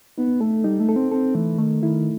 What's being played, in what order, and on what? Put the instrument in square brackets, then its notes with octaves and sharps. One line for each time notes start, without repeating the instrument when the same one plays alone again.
[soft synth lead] B3 [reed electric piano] D#4
[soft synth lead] A3 [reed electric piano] A4
[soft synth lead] G3 [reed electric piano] D#4
[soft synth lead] A3
[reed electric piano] A4
[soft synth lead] C4
[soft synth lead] C4 [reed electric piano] A4
[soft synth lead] E3 [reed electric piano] A3
[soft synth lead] D#3 [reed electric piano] A3
[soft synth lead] D#3 [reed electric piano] E4